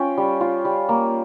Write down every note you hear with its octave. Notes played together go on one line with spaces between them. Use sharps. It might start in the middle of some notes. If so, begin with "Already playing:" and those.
Already playing: C#4 F4 G5
G3
F4
G3
A#3